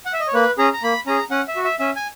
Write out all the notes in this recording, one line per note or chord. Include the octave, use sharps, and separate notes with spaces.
F#5
E5
D#5
C#5
A#3 B4
C#4 G#4 A#5
A#5
A#3 B5
C#4 G#4 A#5
C#4 F#5
E5
F#4
E5
C#4 E5
G#5